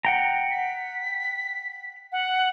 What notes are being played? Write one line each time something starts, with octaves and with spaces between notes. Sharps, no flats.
F#5 G5 A#5
B6
F#5